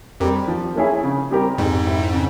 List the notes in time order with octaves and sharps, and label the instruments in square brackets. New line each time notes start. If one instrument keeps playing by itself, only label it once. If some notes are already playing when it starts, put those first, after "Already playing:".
[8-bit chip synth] F2 [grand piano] G3 C4 G4 A#4
[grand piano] F3
A#3 C#4 E4 G#4
C#3
G3 C4 G4 A#4
[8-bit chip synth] F2 G#2 [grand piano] G#3
[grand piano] C4 E4
C#3